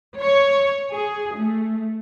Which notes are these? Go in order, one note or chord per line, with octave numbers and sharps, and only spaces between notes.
C#5
G#4
A3